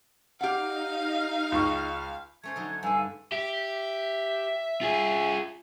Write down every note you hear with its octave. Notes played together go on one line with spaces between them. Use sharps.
D#4 G4 F5 F#5
C#2 C#6
A3 C#4 C5 G#6
D3 F#3 D#4
G2 D3 F5 G#5 E6
G4 E5
F4 G#4